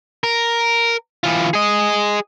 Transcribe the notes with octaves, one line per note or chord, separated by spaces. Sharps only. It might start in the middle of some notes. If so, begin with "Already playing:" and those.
A#4
E3 F4
G#4 D#5